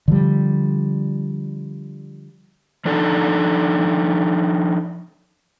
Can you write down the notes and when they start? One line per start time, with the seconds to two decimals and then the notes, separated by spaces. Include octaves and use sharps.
0.08 D3 F3 G3
2.85 F3 D4 D#4 A4